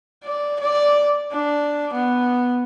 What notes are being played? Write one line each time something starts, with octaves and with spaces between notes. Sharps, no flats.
D5
D5
D4
B3